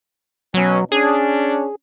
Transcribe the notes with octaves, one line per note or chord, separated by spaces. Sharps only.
B2 F#3 C#4
C#4 D4 G#4